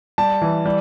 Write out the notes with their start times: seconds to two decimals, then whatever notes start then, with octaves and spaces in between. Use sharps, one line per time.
0.18 G3 A5
0.42 E3
0.66 G3